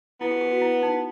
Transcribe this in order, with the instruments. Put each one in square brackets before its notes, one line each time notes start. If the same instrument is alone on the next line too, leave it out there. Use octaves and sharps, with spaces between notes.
[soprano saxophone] B3 [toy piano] E4
[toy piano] G4
G4
F#4
E4
D#4